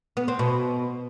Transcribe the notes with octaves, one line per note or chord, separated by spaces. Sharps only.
B3
C4
B2